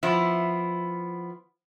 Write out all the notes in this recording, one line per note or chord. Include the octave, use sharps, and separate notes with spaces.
F3 B3 E4